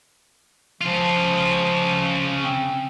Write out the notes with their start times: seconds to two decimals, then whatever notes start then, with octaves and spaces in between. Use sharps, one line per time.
0.81 C#3 F3 F4
2.42 C4